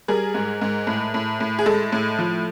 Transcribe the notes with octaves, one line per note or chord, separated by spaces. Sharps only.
G3 G#4 A#4
G#2
G#2
A2
A2
A2
G#4
G#3 A4
A2
F3